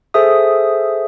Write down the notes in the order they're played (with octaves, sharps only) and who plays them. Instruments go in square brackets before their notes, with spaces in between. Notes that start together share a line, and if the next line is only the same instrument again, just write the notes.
[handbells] G#4 A4 C5 E5 D#6